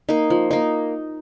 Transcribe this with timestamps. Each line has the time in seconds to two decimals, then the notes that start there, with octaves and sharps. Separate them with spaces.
0.09 A#3 D#4
0.30 F3
0.51 A#3 D#4